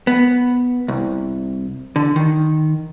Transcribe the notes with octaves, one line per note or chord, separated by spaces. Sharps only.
B3
C2
D3
D#3